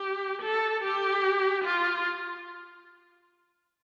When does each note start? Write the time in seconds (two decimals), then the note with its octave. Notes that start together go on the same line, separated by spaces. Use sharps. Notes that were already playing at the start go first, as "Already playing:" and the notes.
Already playing: G4
0.43 A4
0.84 G4
1.65 F4